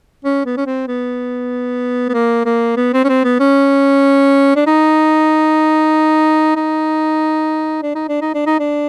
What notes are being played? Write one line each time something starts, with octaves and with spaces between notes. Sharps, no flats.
C#4
B3
C#4
C4
B3
B3
A#3
A#3
B3
C4
C#4
C4
B3
C#4
D4
D#4
D#4
D4
D#4
D4
D#4
D4
D#4
D4